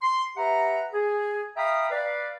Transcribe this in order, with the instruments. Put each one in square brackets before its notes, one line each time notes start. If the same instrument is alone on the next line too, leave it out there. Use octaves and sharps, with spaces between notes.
[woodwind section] C6
G4 B4 E5 F#5 A#5
G#4
E5 F5 G5 A#5 B5 D#6
B4 D5 F5